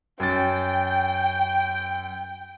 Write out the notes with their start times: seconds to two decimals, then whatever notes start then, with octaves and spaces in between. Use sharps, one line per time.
0.20 F#2 G5 A6